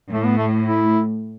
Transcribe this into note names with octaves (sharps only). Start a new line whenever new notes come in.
A2 A3
B3
A3
E4